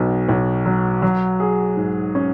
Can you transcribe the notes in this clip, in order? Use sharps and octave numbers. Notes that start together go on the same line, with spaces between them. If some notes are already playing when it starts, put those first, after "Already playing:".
Already playing: B1 B2
B1
F#3
F#3
G#4
G#2
C#4